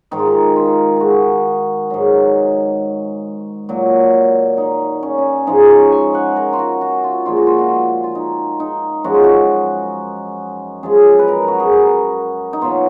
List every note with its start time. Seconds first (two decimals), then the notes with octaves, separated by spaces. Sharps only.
0.11 G#2 D#3 G#3 D#4
0.19 F4
0.26 D#4
0.56 F4
0.96 F#4 G#4
1.90 G#2 F#3
3.69 A#2 F#3
4.58 D#4
5.03 C#4
5.18 C#4
5.47 G#2 F3 G#3 D#4
5.70 C#5
5.92 G#5
6.14 F#5
6.36 A#4
6.53 F4
6.59 F#4
6.81 F#4
7.04 F4
7.26 A#2 F3 G#3 F4
7.37 F#4
7.47 F4
7.58 F#4
7.69 F4
8.04 F4
8.15 D#4
8.60 D#4
9.04 F#2 F3 G#3 F#4
9.14 F4
9.24 F#4
10.83 F#2 F3 G#3 G#4
11.19 B4
11.28 A#4
11.48 F#4
11.60 G#4
11.72 A#4
12.53 D#4
12.62 B2 F#3 F4